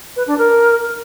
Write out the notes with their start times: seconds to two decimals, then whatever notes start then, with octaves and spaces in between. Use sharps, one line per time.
0.16 B4
0.27 D4
0.38 A#4